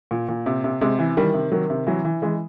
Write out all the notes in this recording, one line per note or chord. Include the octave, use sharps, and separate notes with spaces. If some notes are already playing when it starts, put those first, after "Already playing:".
A#2
A#2
C3
C3
C3 G#3
E3
D#3 G3
C3
D#3 F#3
C3
E3 F#3
E3
E3 G#3